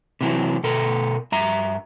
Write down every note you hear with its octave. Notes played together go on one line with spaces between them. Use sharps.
C3 E3 F#3
B2 A4 A#4
G2 E5 A#5